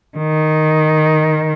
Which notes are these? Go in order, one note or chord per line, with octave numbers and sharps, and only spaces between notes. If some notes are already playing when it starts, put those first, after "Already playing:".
D#3